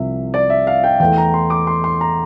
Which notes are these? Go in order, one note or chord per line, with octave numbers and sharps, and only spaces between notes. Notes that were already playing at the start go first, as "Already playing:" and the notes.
Already playing: C2 C3 F3 E5
D5
E5
F5
G5
E2 E3 A3 G5
A#5
C6
D6
C6
C6
A#5